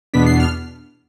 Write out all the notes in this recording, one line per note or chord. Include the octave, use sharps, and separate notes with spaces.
E2 B2 B3 D4 B6
C7
F6